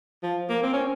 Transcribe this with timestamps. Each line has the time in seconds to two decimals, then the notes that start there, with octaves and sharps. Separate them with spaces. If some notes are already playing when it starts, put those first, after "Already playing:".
0.23 F3
0.49 A#3
0.63 C4
0.73 C#4